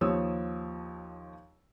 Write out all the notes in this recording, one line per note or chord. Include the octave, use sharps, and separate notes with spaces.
D#2 F3 C#5 D#6 E6